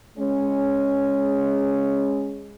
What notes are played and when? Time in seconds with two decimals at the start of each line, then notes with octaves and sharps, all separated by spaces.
0.18 G#3 C#4